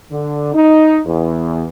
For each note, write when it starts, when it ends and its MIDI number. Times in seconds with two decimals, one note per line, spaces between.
0.12 0.53 50
0.54 1.00 63
1.06 1.68 40